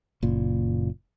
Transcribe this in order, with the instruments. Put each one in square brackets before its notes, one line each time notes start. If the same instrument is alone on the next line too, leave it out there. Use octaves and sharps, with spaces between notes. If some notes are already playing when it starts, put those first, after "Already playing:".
[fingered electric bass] F#1 A#2